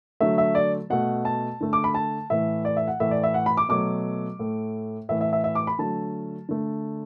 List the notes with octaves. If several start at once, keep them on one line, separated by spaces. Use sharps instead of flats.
D3 F#3 A3 E5
E5
D5
B2 A3 F#5
A5
D3 A3
D6
B5
A5
A2 E3 A3 E5
D5
E5
F#5
A2 E3 A3 E5
D5
E5
F#5
B5
D6
B2 F#3 A3 D6
A2 A3
A2 E3 A3 E5
E5
E5
E5
D6
B5
D3 F#3 A3 A5
D3 A3